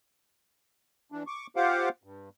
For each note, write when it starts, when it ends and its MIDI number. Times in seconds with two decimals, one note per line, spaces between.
1.12 1.23 52
1.12 1.23 62
1.27 1.47 85
1.27 1.47 86
1.56 1.89 65
1.56 1.89 67
1.56 1.89 72
1.56 1.89 77
1.56 1.89 78
1.56 1.89 86
2.04 2.29 43